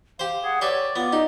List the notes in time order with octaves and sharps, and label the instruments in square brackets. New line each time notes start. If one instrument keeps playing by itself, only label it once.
[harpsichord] G4 C5 [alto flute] F5
[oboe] G#4 [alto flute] F#5
[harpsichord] G4 B4 E5 [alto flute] C#5 [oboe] D5
[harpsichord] B3 [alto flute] F4
[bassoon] D#4 [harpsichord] G4 [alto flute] D5